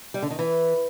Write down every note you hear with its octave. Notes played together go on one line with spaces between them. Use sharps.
G3
D3
D#3
E3